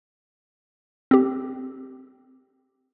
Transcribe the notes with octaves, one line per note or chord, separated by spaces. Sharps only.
C4 G4